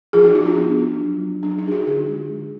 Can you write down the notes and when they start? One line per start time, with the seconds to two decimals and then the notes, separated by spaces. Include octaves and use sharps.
0.13 F3 F4 G#4
0.24 D#4 F#4
0.35 F3 D#4 F#4
0.46 D4 F4
0.57 B3 D4
0.78 D4
1.00 F#3
1.22 F#3
1.43 F#3 D4
1.58 D#4
1.65 D4 G#4
1.72 D#4 F#4
1.87 D3 F4 G#4
2.08 G#3
2.30 D3